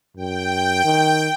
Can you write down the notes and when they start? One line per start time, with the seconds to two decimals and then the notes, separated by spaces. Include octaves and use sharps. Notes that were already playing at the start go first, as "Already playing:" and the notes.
0.17 F#2 G5
0.84 D#3